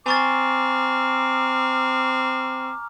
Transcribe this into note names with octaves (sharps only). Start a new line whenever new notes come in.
C4 G#5 A#5 C#6 D6 F6 A6